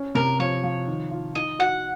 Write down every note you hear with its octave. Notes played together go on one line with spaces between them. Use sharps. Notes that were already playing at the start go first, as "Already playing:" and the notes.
Already playing: C#4
C3 A#4
F3 C#5
F3
D#3
F4
D#4 D#5
F#4 F#5